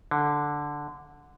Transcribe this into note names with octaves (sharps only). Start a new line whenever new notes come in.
D3